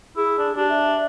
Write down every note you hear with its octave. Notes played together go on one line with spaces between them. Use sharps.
E4 G#4
D4
D4 G4
E5